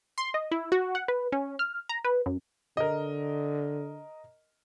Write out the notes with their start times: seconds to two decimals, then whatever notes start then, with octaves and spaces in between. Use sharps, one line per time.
0.18 C6
0.34 D#5
0.51 E4
0.72 F#4
0.95 F#5
1.08 B4
1.32 C#4
1.59 F6
1.89 A#5
2.04 B4
2.26 F#2
2.77 D3 A#4 D#5